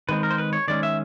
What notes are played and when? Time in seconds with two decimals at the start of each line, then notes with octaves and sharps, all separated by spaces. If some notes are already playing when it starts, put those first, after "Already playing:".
0.09 D#3 G#3 C4 B4
0.23 A#4
0.31 C5
0.38 B4
0.53 C#5
0.68 D#3 G#3 C#4 D5
0.83 E5